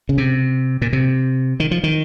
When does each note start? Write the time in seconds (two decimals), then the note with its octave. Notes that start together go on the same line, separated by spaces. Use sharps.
0.09 C#3
0.18 C3
0.82 A#2
0.93 C3
1.60 D#3
1.71 F3
1.83 D#3